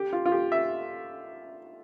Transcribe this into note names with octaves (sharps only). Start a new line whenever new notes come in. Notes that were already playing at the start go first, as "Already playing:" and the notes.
Already playing: G4
F4
F4
G4
E5